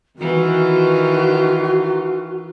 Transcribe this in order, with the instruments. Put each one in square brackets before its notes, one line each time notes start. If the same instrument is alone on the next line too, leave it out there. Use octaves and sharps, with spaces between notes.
[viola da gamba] D#3 E3 F4 [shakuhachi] F#4